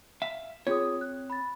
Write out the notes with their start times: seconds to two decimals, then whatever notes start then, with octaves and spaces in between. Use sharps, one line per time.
0.22 E5 F5
0.67 C4 F4 G#4 C#5 D#6
1.01 F#6
1.30 B5 A6